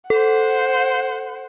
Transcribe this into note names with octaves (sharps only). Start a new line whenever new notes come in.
A4 C5 F#5